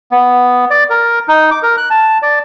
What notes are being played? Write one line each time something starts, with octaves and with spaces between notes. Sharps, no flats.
B3
D5
A#4
D#4
D6
A#4
F#6
A5
D5